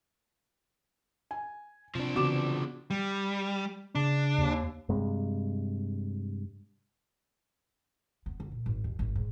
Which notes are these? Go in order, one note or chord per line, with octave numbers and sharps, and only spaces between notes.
G#5
C3 F3 D4
C#3 E3 B3 F#4 D6 E7
G3
C#3 D4
D#2
G2 C3 G#3
B3
D2
A#2
G#1
D#2
G#1
G#2